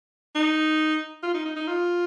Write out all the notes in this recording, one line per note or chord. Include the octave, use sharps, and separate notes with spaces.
D#4
F4
D#4
D#4
D#4
F4